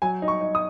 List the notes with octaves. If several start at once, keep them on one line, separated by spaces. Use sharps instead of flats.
F#3 G#5
D#4
C#6
D#4
D#6